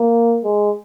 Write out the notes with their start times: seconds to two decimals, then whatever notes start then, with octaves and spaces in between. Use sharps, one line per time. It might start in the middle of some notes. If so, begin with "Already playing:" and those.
Already playing: A#3
0.44 G#3